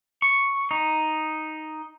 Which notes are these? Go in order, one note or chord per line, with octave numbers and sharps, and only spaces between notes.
C#6
D#4